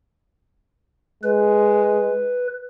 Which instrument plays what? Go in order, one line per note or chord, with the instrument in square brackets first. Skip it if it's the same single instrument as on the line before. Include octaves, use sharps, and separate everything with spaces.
[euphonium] G#3 [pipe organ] B4